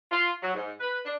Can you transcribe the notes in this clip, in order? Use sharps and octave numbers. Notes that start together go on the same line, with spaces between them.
F4
F#3
G#2
B4
D4